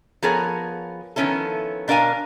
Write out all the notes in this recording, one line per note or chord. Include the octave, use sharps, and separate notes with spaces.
F3 B3 G#4 A#4 C#5
D#3 F3 B3 C#4 E4 A4
B2 D4 A#4 F5 G#5